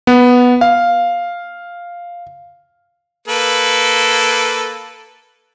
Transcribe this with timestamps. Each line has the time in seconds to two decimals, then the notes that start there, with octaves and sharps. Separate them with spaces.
0.07 B3
0.61 F5
3.28 A#3 A4 B4